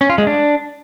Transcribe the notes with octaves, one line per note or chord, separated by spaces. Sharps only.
C#4
F4
G#3
D4